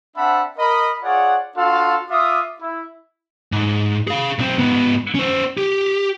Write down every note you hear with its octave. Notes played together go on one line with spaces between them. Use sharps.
C4 D4 E5 F#5 A5 B5
A#4 D#5 B5
F4 G#4 C#5 D5 F#5
D4 F4 F#4 A4 F5 C6
F4 E5 D6 D#6
E4
G#2
G#4 F5
B1 C4
G#2 B3
C#4 C5
G4